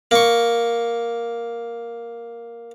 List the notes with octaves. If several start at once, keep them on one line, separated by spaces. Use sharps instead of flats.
A#3 C#6